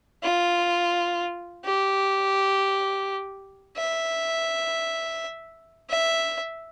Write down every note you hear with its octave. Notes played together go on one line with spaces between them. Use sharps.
F4
G4
E5
E5